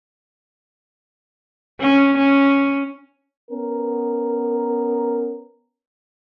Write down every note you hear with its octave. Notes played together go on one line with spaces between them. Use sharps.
C#4
C#4
B3 C#4 A#4